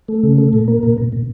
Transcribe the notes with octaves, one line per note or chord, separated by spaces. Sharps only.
A3
C#3
A3
A#2
A#3
A#2
A#2
A#2